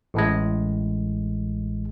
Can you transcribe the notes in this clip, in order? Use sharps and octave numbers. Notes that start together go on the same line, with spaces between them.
A1 A2 G#3